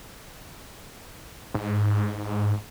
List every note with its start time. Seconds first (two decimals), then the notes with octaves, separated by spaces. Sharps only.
1.54 G#2